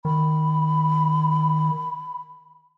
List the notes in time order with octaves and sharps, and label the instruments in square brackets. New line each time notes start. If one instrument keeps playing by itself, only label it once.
[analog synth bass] D#3 [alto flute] B5